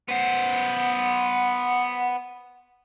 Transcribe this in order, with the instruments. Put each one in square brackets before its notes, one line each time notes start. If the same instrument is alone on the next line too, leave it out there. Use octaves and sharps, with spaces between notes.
[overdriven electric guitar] B3 C5 [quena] F#5